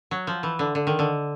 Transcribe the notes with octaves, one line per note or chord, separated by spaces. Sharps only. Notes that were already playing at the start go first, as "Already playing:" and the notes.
F#3
F3
E3
D3
D3
D#3
D3